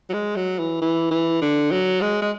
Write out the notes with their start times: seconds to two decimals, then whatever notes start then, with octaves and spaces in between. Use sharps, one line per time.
0.09 F#3
0.13 G#3
0.36 F#3
0.59 E3
0.81 E3
1.11 E3
1.41 D3
1.71 F#3
2.01 G#3
2.22 G#3